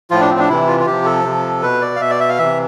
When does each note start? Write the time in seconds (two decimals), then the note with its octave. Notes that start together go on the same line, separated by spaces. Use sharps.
0.11 A2 F3 F4
0.20 D4
0.30 C4
0.39 D4
0.48 C3 E3 E4
0.67 F4
0.80 F4
0.86 C3 F3 G4
1.05 A4
1.24 C3 F3
1.62 B2 B4
1.81 D5
1.96 F5
2.00 B2 E5
2.10 D5
2.20 E5
2.29 F5
2.38 C3 E3 E5